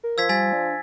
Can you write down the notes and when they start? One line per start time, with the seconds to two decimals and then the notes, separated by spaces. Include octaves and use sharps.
0.03 A#4
0.18 F3 E6 G#6 B6
0.29 G3 G#5 A6 B6
0.53 D4